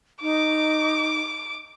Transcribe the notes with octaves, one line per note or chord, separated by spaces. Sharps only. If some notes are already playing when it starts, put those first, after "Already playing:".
D#4 D6